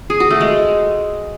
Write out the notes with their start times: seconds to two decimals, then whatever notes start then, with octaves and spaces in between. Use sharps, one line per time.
0.10 G#4
0.20 F#4
0.30 A3
0.41 G#3